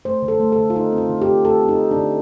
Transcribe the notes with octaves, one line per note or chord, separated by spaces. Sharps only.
A3 C5
D3
A4
A3
A4
D3
F4
D3 D#4
C4
F4
D3
G4
D3
A3 A4
C4
D#4
C4
D4
D3